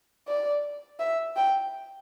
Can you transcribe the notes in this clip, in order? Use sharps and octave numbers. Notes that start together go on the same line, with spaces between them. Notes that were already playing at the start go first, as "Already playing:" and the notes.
D5
E5
G5